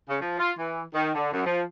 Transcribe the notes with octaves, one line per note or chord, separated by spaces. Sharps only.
C#3
F3
F4
E3
D#3
D3
F#2
F3